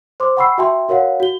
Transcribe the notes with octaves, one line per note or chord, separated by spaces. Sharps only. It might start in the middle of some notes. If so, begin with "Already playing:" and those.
C5 C6 D6
F#5 G5 B5 C#6 E6 C7
F#4 E5 G5 A5 C6
F#4 A#4 C#5 F5 F#5
F#4 G7